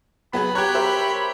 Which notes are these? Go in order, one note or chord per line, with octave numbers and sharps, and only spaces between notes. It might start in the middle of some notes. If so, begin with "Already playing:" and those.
F#3 B3 F#4 G#4 B5
G4 C#5 A#5 F#6 G#6
A#4 C5 E5